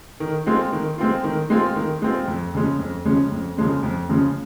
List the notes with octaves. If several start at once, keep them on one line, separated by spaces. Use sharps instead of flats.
D#3
G#3 C4 F4
D#3
G#3 C4 F4
D#3
G#3 C4 F4
D#3
G#3 C4 F4
F2
C#3 F3 G#3 C#4
F2
C#3 F3 G#3 C#4
F2
C#3 F3 G#3 C#4
F2
C#3 F3 G#3 C#4